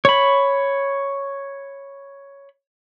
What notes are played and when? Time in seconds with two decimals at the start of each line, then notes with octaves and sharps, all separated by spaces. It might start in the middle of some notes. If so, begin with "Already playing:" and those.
0.05 C#5 B5